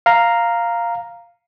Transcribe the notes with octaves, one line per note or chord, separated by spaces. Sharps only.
F5 A#5